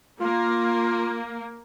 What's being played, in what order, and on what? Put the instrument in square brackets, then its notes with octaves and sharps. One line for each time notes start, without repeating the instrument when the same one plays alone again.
[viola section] A#3 [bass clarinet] F4